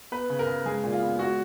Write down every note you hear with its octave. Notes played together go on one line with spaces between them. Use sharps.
B3 B4
C#3
A#4
C#3
G#3 G#4
A#2
F4
B3
G#3 F#4